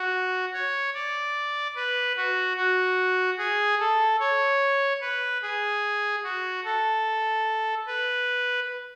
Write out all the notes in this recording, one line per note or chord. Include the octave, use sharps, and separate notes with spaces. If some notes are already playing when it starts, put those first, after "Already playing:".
Already playing: F#4
C#5
D5
B4
F#4
F#4
G#4
A4
C#5
B4
G#4
F#4
A4
B4